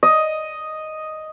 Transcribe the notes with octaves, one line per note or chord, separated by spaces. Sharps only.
D#5